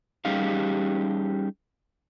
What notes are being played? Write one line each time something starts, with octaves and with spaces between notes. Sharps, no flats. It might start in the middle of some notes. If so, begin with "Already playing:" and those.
G3 C#4 D#4 G4 G#4 F5